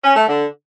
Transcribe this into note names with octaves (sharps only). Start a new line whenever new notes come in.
C#4
A3
D3